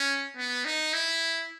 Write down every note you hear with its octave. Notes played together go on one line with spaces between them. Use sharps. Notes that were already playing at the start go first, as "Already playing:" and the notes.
Already playing: C#4
B3
D#4
E4